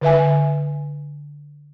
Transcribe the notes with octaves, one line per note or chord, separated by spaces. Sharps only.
D3 B4 E5 G#5